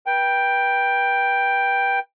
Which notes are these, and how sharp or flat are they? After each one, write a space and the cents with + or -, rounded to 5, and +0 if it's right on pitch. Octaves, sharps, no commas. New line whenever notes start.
B4 -35 G5 +5